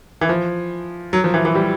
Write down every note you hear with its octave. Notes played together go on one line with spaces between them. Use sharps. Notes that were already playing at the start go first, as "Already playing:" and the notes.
E3
F3
F#3
F3
E3
E3
G3